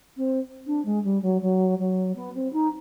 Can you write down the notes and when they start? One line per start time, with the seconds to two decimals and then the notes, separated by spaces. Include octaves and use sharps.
0.17 C4
0.67 D4
0.85 G#3
1.04 G3
1.22 F#3
1.41 F#3
1.79 F#3
2.16 B3
2.34 C4
2.53 D#4